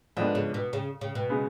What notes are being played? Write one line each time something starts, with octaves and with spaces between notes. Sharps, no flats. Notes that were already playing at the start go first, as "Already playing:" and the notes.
G#2 D3 F3 B3 D4
C#3
B2
C#3
C#3
B2
C#3 G#3 B3